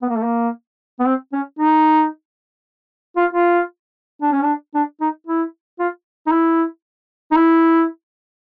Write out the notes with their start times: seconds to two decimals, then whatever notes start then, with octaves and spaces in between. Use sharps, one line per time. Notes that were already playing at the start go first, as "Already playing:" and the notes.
0.02 B3
0.09 A#3
0.17 A3
0.23 A#3
1.00 B3
1.07 C4
1.33 C#4
1.59 D#4
3.17 F4
3.33 F4
4.22 D4
4.32 C#4
4.43 D4
4.75 D4
5.01 D#4
5.27 E4
5.79 F4
6.27 D#4
6.32 E4
7.32 D#4
7.37 E4